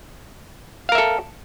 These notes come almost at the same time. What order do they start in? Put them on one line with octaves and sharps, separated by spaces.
F5 A#4 E5 A4